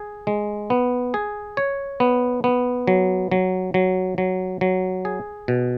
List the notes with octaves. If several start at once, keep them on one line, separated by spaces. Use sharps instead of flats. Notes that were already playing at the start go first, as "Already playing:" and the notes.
Already playing: G#4
G#3
B3
G#4
C#5
B3
B3
F#3
F#3
F#3
F#3
F#3
G#4
B2